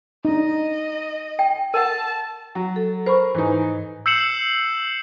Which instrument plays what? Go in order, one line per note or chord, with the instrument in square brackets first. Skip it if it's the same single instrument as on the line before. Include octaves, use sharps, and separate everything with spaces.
[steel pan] D4 D#4 [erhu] D#5
[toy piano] G5
[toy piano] A#4 F#5 [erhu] A5
[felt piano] F#3
[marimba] A4
[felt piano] A#4 [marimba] C5 B5 C#6
[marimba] G#2 B4 G#5 [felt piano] E3 D#4
[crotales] E6 G6 C7 C#7 E7 F#7